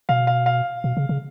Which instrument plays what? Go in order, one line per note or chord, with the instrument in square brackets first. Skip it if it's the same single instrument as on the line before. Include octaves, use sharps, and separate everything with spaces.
[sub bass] B2 [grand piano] F5
[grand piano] F5
F5
[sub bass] B2
C#3
C#3